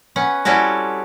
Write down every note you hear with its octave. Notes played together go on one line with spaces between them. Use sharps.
B3 C#4 F#5
G3 C4 C#4 E4 F#4 A4